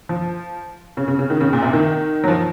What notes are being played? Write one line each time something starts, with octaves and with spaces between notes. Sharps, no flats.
F3
C#3
C#3
C#3
D#3
C#3
A#2
C3
D#3
F#3
F3